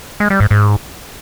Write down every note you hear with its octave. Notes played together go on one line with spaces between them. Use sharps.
G#3
G3
G#2
G#2